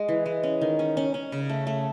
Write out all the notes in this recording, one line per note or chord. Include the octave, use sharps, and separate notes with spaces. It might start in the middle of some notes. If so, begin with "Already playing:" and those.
Already playing: G#3
E3
G#3
C#4
D#3
C#4
C#4
C#4
C#3
A3
A3